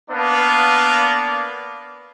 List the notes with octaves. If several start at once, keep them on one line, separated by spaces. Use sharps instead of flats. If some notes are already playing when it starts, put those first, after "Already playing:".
A#3 B3 D4 D5 F5